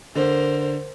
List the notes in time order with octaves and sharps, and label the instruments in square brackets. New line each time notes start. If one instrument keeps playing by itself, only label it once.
[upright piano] D3 [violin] A#4 C5